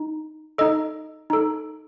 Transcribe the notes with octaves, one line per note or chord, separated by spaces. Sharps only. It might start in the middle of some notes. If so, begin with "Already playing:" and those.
Already playing: D#4
D#4 A4 D#5
D#4 A4